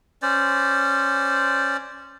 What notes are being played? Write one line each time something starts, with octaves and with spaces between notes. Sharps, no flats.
C#4 C5 D5